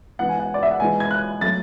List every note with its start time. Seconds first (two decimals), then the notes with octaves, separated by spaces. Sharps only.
0.19 G#2 E3 B3 F#5
0.29 G#5
0.39 F#5
0.54 D5
0.63 E5
0.71 F#5
0.80 G#2 E3 G#3 B3 G#5
1.00 G#6
1.11 F#6
1.41 F#3 A3 A6